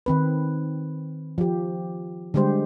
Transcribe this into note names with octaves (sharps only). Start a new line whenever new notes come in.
D#3 C4 B4
F3 G4
D3 G3 G#3 G4 C5